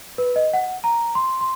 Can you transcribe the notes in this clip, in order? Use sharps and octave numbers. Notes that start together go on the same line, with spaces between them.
B4
D#5
F#5
A#5
C6
C6